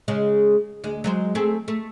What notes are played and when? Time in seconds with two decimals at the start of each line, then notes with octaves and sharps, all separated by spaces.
0.08 C#3 G#3
0.84 D2 G#3
1.04 F#3 G#3 C5
1.35 A3 C4 G#4
1.68 A3